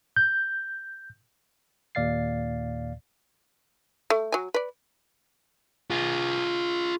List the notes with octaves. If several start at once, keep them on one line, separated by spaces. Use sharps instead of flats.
G6
D#2 A#2 D5 F5 A6 C7
A3
F#3 G#5
B4 D5
F4 G#4